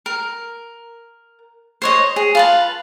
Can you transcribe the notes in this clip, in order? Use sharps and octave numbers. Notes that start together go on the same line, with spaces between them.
A#4
C5 C#5 D#5
G#4
F4 B4 A5